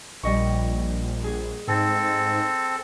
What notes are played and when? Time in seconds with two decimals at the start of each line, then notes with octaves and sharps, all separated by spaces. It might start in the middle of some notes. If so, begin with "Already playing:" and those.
0.23 A#1 G3 D#5 C#6
1.24 G#4
1.68 G#2 C4 A4